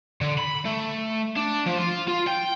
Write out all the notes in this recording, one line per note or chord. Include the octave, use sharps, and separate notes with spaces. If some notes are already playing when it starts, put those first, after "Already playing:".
D3
B5
A3
D4
F3
F4
F4
G5